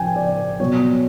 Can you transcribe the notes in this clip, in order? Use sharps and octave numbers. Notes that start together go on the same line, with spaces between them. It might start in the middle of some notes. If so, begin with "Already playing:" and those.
Already playing: C#3 F3 G5 G#5
D5
B2 F#3 C#5